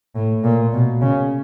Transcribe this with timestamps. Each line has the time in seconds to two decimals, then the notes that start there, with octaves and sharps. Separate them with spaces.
0.15 A2
0.44 A#2
0.73 B2
1.01 C#3